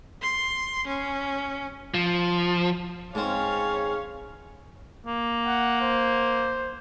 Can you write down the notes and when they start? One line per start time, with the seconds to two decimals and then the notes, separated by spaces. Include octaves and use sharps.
0.22 C6
0.87 C#4
1.94 F3
3.15 G#2 C4 C#4 C#5 F5
5.07 A#3
5.46 F#5
5.81 C5